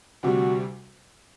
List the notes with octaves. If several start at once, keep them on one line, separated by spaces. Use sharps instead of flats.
D2 C3 G3 F#4